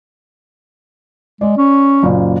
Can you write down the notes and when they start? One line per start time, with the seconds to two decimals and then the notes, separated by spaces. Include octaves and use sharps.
1.41 G#3 D5
1.58 C#4
2.03 F#1 A#2